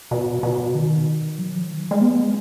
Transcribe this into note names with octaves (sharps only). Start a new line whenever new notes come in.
B2
B2
D#3
F#3
F3
D#3
F#3
G#3
B3